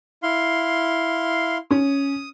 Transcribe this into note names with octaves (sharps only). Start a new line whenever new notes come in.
E4 F5 C6
C#4 D#6